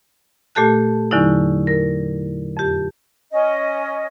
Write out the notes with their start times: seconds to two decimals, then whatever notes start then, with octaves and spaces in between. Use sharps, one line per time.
0.55 A#2 A3 G4 A4 A5 F#6
1.11 E2 D3 F#3 C#4 D#4 E4
1.67 A#4
2.57 F2 G4
3.31 C#4 D#5